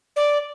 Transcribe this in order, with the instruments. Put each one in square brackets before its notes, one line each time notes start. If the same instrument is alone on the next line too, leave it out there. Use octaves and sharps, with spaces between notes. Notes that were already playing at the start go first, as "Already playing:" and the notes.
[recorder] D5